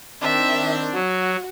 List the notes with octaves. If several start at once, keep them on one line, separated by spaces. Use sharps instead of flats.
D#3 C4 D4 E5
F#3 F#4